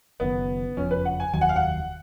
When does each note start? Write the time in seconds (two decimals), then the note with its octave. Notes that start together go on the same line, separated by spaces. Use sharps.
0.20 F#1 F#2 D#3 B3
0.77 F#1 F2 F3 C#4
0.91 B4
1.05 F#5
1.20 G#5
1.33 F1 D#2 D#3 F#3 G#5
1.41 F#5
1.49 F5
1.56 F#5